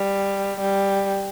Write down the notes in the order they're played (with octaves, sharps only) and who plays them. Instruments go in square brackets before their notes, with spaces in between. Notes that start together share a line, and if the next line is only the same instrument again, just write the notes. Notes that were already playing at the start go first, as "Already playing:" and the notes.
Already playing: [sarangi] G3
G3